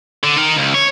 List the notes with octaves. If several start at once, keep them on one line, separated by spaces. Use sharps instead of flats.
D3
D#4 A#4
C#2
C#5